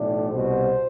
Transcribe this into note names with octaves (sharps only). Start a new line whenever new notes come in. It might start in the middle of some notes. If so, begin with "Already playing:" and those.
Already playing: B1 A2 E3 D4
C2 B2 C5